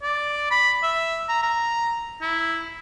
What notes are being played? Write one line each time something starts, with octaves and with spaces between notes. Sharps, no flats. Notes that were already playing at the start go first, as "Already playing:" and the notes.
D5
B5
E5
A#5
A#5
E4